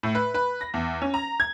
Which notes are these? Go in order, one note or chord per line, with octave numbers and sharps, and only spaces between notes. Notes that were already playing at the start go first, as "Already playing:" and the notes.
A2
B4
B4
A#6
E2
C#4
A#5
G#6